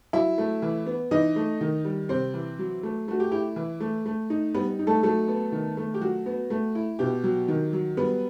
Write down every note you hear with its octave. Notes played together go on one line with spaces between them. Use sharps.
F#3 E4 E5
A3
E3
B3
E3 D#4 D#5
A3
D#3
G3
C3 C4 C5
E3
F#3
A3
A3 F#4
G4
E4 G4
E3
A3
A3
D#4
G3 B3 B4
D#4
A3 A4
F#3 A3 A4
B3
D#3
A3
G4
F#3 F#4
B3
A3
E4
B2 G4
F#3
D#3
F#3
G3 B3 B4